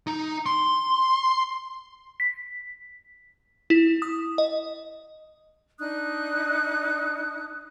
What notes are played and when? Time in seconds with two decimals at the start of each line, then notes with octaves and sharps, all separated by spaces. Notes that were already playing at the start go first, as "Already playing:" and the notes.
0.07 D#4
0.46 C6
2.20 B6
3.70 E4
4.02 D#6
4.38 D#5
5.79 D4 D#4 D#6 F#6